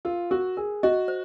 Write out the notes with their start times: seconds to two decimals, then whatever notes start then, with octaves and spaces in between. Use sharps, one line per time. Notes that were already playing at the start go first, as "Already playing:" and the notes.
0.05 F4 A#4
0.30 F#4 A#4
0.57 G#4 A#4
0.83 F#4 D#5
1.08 C5